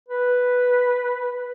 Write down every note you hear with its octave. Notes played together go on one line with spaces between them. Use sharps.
B4